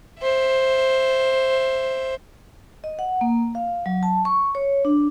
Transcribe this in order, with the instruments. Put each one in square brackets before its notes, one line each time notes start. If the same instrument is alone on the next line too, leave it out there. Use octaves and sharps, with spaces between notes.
[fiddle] C5 E5
[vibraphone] D#5
F#5
A#3
F5
F#3
A5
C#6
C#5
D4